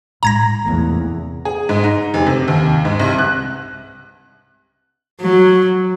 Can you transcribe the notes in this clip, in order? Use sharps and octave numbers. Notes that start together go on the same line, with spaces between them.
A2 G#3 A#5 G#6 A#6
F1 E2 A3 A#3
G#4
G#2
D#4
F1
C3
D#2
G#2
C2
F#6
F#3